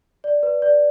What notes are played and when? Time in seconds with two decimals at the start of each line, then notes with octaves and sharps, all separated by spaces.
0.24 D5
0.43 B4
0.62 D5